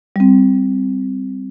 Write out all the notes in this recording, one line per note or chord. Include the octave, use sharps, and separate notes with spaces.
G3 C4